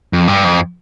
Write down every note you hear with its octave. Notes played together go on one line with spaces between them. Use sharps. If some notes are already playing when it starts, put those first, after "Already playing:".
F2
G2
F2